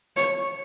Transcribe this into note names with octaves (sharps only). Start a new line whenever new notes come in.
C#5